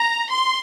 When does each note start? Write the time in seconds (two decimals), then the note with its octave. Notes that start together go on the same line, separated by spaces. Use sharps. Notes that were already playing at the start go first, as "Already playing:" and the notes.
Already playing: A#5
0.31 C6